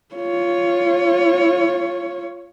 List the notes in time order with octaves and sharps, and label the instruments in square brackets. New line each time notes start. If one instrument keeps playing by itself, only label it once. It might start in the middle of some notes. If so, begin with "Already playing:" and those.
[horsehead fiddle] F4 C#5